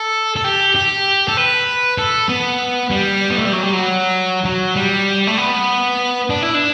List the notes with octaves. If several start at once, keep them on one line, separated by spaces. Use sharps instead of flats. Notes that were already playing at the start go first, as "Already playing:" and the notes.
Already playing: A4
A4
G4
G4
A4
B4
A4
B3
G3
B3
A3
G3
F#3
G3
F#3
F#3
G3
A3
B3
D4
E4
D4